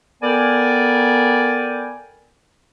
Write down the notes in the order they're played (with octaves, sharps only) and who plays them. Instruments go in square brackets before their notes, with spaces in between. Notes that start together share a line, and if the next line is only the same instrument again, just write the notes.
[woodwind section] B3 A4 A#4 D5 G5 G#5